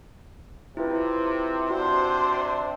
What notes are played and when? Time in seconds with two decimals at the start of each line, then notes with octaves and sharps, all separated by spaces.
0.77 C3 E4 F4 B4
1.70 C3 D4 F#4 C5